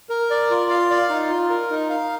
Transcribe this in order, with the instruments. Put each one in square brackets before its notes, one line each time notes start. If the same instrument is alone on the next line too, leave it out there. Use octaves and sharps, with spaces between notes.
[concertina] A#4
D5
F4
F5
D5
D#4
F4
A#4
D#4
F5